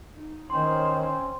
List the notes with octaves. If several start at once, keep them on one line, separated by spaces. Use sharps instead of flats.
D#4
D#3 C4 C#4 C5 C#5 C6